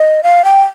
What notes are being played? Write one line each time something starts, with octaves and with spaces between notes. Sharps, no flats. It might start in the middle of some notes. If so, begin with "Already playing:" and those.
Already playing: D#5
F5
G5